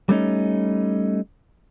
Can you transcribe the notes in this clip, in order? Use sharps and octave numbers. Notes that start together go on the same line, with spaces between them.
G3 A3 C#4 D#4